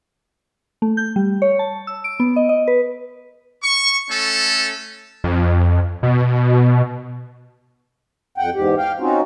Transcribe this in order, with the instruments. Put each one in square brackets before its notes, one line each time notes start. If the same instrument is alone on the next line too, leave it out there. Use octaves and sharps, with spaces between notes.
[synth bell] A3
G6
G3
C#5
A5
E6
D7
B3
D#5
D#5
B4
[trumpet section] C#6
A3 C#4 A4
[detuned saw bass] F2
B2
[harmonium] F2 F#5 G5
E2 G#2 G4
F5 G5
C4 C#4 D#4 F4 F#4